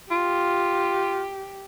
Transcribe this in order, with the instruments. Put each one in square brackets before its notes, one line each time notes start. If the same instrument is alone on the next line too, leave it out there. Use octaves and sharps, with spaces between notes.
[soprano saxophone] F4 [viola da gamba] G4